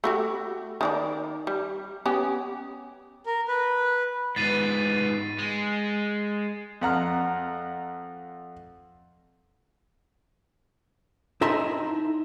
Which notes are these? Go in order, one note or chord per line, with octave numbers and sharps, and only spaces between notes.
A3 F#4 G4
D#3 D4 D5
G3
B3 C#4 G4
A#4
B4
G#2 B3 A6 C7 D#7
G#3
F2 F#5 A#5 F6
D#4 E4 E5 A5 A#5 C6